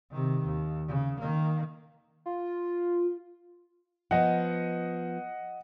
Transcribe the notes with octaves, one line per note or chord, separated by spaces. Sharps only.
C3 D#3
D#2
C#3
D#3 A#3
F4
F3 B3 D#5 F#5